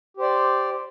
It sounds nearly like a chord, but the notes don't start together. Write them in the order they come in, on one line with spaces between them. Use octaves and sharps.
G4 C5 D5